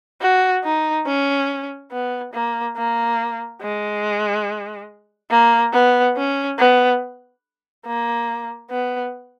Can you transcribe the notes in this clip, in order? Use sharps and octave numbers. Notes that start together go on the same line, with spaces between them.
F#4
D#4
C#4
B3
A#3
A#3
G#3
A#3
B3
C#4
B3
A#3
B3